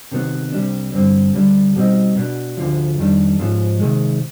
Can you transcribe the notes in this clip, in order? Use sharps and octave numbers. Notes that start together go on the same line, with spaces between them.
C3 D#3 B3
C2 C3 G3 D4
G2 D3 G3 C4
D2 D3 G3 D4
B2 G3 C4 D#4
B2 B3 D4
D2 D3 F3
F2 D#3 G3 D4
G#2 F3 B3
C3 D#3 G#3